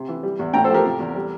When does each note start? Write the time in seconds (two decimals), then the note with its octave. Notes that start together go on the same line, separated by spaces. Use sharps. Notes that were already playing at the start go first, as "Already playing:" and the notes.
Already playing: C3
0.08 E3
0.23 G3
0.39 E2
0.53 A2 G5 A#5
0.64 A4 C5
0.70 F3 G4 A#4
0.85 C3
1.00 E2
1.15 G3